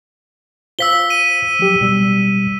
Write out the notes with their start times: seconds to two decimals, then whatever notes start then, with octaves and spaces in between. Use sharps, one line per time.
0.79 F4 C5 F5 E6 B6 G7
1.10 D#7
1.59 F3 F#3 G4
1.81 B2 G3 E6